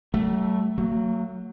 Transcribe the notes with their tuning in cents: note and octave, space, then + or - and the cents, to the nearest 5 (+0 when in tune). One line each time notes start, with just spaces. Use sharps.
F#3 +45 A3 +0
F#3 +0 A#3 -45